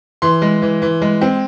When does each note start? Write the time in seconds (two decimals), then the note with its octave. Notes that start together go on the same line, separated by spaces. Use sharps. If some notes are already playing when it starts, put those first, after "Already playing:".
0.22 E3 C6
0.42 G#3
0.62 E3
0.82 E3
1.02 G#3
1.21 C4